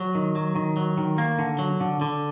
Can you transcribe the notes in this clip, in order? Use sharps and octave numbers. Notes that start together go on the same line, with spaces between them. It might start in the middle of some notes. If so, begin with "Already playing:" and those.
Already playing: F#3
D#3
F#3
D#3
F#3
D#3
A#3
D3
F#3
D3
D3